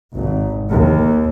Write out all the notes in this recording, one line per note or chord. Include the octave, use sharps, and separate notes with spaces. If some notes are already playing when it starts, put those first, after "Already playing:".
G#1
D#2